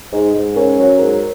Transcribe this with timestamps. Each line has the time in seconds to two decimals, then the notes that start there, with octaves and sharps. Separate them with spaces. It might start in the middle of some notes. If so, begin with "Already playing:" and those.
0.12 G#2
0.34 G#2
0.56 C#4 A#4
0.78 F#3
0.99 G#2 A#4